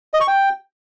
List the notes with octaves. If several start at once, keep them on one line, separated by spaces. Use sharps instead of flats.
D#5
C#6
G5